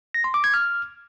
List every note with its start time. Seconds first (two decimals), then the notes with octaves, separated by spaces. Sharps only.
0.14 A#6
0.24 C6
0.34 D6
0.44 G#6
0.54 F6